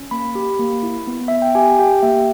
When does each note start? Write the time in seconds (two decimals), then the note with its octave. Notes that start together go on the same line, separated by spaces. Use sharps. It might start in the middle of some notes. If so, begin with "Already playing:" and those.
Already playing: C#4
0.11 A#3 B5
0.35 G4
0.59 A#3
0.83 E4
1.07 B3
1.28 B3 E5
1.42 G5
1.55 G4 G#5
1.79 G4 G5
1.92 G5
2.03 A#3 E5